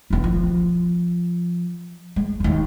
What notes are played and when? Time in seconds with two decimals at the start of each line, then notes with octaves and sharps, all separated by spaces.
0.10 E1 B3
0.24 F3
2.16 G#3
2.40 E1 D#2